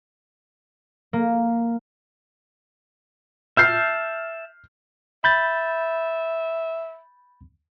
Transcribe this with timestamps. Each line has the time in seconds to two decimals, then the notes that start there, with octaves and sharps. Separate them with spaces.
1.13 A#3
3.57 E5 A5 F6 G6 C7
5.24 E5 B5 G6 A6